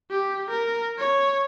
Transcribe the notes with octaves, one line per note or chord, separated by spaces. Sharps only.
G4
A#4
C#5